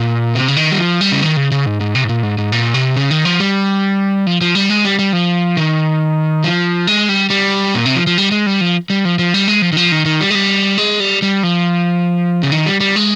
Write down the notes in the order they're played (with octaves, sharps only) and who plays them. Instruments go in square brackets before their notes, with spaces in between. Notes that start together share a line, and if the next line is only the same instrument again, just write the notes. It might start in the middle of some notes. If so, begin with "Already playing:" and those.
Already playing: [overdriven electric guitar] A#2
C3
C#3
D#3
G3
F3
G3
C#3
D#3
C#3
C#3
G#2
G#2
C3
G#2
A#2
G#2
G#2
A#2
C3
C#3
D#3
F3
G3
F3
F3
G3
G#3
G3
G3
F3
D#3
F3
G#3
G3
G3
A#2
C3
F3
F3
G3
G#3
G3
F3
G3
F3
F3
G3
G#3
F3
D#3
F3
D#3
D#3
G3
G#3
G3
G#3
G3
G3
F3
C#3
D#3
G3
G3
G#3